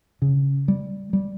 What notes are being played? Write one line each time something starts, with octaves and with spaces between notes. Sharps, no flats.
C#3
G3
G3